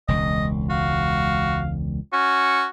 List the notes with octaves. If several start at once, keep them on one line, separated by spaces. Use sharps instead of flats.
E1 C#2 D#5
F#4 F5
C#4 F#4